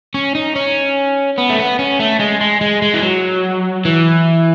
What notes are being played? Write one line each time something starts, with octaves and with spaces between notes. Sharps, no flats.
C#4
D#4
C#4
B3
A3
B3
C#4
A3
G#3
G#3
G#3
G#3
E3
F#3
E3